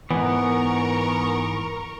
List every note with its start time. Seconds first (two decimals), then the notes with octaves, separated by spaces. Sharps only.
0.11 G#2 E3 B3 A#4 C#6